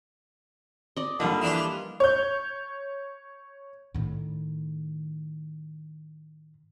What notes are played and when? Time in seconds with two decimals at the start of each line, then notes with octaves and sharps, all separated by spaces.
0.96 D5 D#5
1.20 D3 G3 A#3 F4 B4 D#5
1.42 E3 D4 G4
2.00 C#5 G6
3.95 A2 D#3